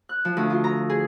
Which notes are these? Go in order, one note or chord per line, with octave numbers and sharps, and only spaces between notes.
F#6
F3
D2
F4
A#5
G#4